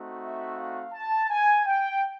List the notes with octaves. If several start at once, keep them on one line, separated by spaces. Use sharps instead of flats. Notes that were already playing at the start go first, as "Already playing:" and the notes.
Already playing: A3 C4 D#4 F#4
E5
F5
A5
G#5
G5